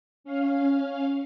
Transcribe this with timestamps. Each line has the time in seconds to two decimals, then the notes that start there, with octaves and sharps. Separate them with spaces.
0.24 C#4 F5